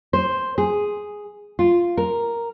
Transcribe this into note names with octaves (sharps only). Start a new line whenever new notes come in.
C5
G#4
F4
A#4